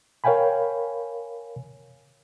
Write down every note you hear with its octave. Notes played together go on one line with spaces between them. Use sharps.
A#4 C#5 F5 G5 G#5 B5